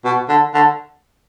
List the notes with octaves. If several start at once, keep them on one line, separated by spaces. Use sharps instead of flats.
B2
D3
D3